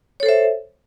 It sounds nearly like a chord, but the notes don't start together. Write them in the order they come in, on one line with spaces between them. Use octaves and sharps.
C#5 A4 C5 E5